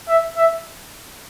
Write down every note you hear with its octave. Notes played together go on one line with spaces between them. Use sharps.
E5
E5